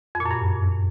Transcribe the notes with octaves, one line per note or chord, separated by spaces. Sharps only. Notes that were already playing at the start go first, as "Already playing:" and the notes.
F2
A#2
F#2
G2